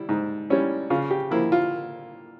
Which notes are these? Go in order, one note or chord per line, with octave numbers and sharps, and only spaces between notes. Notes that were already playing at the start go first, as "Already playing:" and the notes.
Already playing: G3 E4
G#2
G3 C#4 E4
C#3 F4
G4
F3 A#3 E4
F4